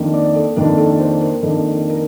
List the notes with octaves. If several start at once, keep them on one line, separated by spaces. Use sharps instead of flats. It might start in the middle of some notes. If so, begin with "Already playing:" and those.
Already playing: F2 D#3 A#3 D4
D5
A4
F2 D#3 A#3 D4 A#4
A4
C5
A#4
F2 D#3 A#3 D4 A4
A#4
A#4